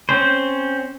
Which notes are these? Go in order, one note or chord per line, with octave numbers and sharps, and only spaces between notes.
C4 C#4 C5